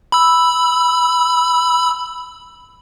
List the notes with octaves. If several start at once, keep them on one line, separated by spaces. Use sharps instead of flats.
B5 E6